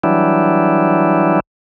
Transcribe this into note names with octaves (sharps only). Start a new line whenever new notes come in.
E3 F#3 G3 D4 E4